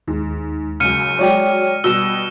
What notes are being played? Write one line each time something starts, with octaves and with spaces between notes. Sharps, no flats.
D#2 G#2
C#2 F#2 F6 C#7 D#7
F#3 G#3 C#5 D5 G5
B2 G3 E6 E7 G7